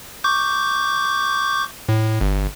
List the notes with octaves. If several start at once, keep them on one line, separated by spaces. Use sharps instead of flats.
C#6 D6 G6
A2
G1